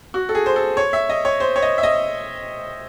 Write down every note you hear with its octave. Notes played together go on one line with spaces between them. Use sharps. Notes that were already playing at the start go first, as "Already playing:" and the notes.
F#4
A4
G#4
C5
A4
C#5
E5
D#5
C#5
C5
C#5
D#5
E5
D#5